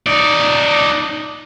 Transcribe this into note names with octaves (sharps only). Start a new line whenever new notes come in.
D#4 D5